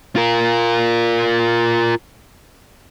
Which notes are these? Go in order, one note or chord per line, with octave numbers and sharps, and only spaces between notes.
F4 A#4